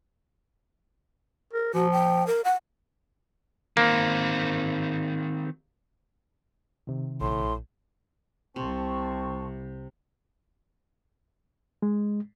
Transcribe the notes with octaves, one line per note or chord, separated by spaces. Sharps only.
A#4
F3 F#4
G5
A#4
F#5
D#3 A#3 C4
C3 D#3
A#1 A2 C6
C2 C3 C4 A5 C6 C#6
G#3